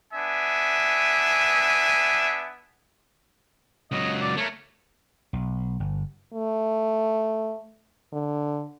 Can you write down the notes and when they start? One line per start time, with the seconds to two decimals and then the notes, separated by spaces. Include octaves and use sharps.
0.13 B3 D4 E5 G#5
3.92 C#2 F#3 D#5
4.21 D5
4.37 A3 A#4 C#5
5.33 B1
5.80 G1
6.34 A3
8.13 D3